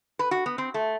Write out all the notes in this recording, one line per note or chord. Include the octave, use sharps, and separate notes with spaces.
B4
F#4
B3
C4
A3